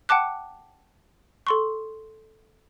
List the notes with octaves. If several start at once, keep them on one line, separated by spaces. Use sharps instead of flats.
F#5 G5 A5 D6 F#6
A4 C6 C#6